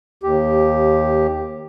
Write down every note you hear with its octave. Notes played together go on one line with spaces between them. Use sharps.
D#2 G4